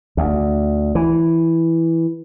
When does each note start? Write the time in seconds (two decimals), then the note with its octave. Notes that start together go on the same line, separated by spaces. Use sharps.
0.17 D2
0.95 E3